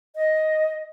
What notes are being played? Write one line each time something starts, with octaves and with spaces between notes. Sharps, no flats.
D#5